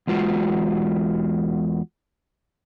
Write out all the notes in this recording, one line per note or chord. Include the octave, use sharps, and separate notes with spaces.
E2 G#3 F4 F#4